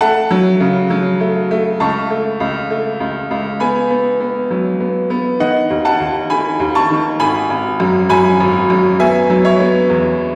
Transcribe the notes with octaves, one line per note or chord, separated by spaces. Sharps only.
A3 F#5 A5
F#3
C#3
F#3
A3
A3
C#2 A5 C#6
A3
C#2
A3
C#2
C#2
B3 G#5 B5
B3
B3
F#3
B3
B3
D#3 D#5 F#5
D#2
F#5 A5
D#2
D#3 G#5 B5
D#2
A5 C#6
D#3
G#1 G#5 B5
G#1
F#2
F#2 G#5 B5
G#1
F#2
B3 E5 G#5
F#3
C#5 E5
B3
E2